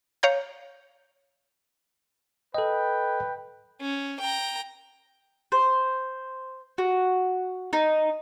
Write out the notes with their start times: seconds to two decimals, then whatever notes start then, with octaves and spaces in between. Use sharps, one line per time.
0.23 C#5 F5 A#5 G6
2.55 A4 B4 D#5 G5
3.81 C#4
4.21 G5 A#5
5.52 C5
6.78 F#4
7.73 D#4